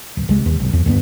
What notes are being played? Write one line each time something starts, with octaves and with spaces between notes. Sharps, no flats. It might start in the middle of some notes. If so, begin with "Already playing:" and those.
D1
C2 G#3
D#2
B1
E2
D2 G2 B3